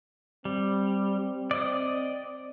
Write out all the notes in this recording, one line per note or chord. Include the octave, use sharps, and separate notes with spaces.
G3 C4
D5 D#5 D#6